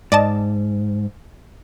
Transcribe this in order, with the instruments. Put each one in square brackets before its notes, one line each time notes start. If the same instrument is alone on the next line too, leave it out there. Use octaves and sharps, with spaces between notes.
[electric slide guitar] G#2 [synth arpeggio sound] D5 D#5 A5